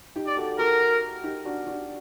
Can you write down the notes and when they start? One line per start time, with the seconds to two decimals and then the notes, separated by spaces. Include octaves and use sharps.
0.16 D#4 G4
0.26 D5
0.37 F#4 A4
0.58 F#4 A4 A#4
1.24 D#4 G4
1.45 D4 F#4
1.62 G4
1.67 D4 F#4